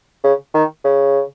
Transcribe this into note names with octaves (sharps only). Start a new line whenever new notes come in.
C#3
D#3
C#3